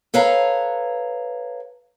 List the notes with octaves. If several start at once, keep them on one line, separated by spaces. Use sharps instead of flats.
A4 B4 C#5 F5 A#5